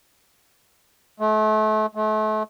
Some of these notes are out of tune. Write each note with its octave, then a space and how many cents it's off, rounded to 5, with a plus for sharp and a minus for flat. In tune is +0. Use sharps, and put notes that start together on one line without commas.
A3 -35
A3 -35